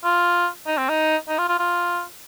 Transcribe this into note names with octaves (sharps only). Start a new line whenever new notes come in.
F4
D#4
C4
D#4
D#4
F4
F4
F4